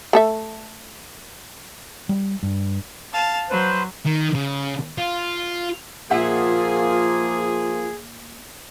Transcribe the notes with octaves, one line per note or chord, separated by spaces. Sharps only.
A3 A4 E5
G3
G2
F5 A5
F#3 B4 C5
D#3
C#3
F4
A#2 F3 A#3 F4 G#4 E5 F#5